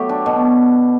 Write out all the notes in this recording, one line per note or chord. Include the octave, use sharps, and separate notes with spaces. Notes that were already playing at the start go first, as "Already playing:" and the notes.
Already playing: F#3 A3 B3 G4
D4
B2